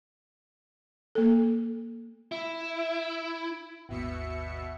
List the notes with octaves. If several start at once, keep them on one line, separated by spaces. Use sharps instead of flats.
A#3 A4
E4
G#1 D#2 B2 E5 C#7